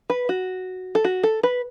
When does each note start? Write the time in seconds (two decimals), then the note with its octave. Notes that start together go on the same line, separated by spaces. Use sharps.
0.10 B4
0.29 F#4
0.95 A4
1.04 F#4
1.23 A4
1.43 B4